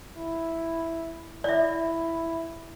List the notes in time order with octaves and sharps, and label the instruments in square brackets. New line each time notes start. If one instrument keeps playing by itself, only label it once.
[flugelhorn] E4
[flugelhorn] E4 [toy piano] D5 E5